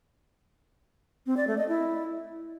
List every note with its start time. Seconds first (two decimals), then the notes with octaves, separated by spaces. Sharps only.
1.26 C4
1.37 D5
1.47 A3
1.58 D#5
1.68 E4